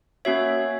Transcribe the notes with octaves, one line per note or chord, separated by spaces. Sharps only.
A#3 C#4 F#4 C#5 E5